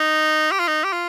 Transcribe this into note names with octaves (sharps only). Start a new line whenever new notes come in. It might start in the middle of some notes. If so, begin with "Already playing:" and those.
Already playing: D#4
G4
F4
D#4
G4
F4